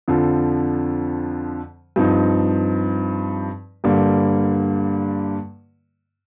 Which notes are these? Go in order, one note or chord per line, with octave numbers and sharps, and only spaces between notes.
F2 D3 F3
G2 F3 C4 D#4
G2 D3 G3 A#3